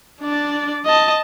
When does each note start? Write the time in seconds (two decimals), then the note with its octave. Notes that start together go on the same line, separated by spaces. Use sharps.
0.21 D4 D5
0.85 D#5 A5